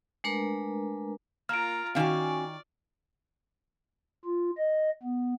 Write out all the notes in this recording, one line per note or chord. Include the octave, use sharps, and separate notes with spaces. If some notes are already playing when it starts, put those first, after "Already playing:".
G#3 A3 D4 A#4 B4 A#5
A#3 F4 A#5 F6 D7
D#3 C#4 F#4 D5 F5 G#5
F4
D#5
B3